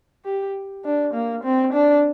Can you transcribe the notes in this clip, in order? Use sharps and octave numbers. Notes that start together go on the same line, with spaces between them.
G4
D4
A#3
C4
D4